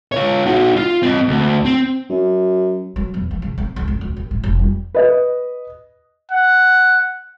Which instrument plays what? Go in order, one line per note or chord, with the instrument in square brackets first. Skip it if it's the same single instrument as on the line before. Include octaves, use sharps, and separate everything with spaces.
[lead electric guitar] F4 C#5
D#4 F#4
F4
C4 D#5
D2
C4
[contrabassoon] F#2
[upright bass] F#3
E2
F3
C#3
C4
C#2
F2
D2
D#2
A2
F1
G3
[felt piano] B4 D#5
[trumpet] F#5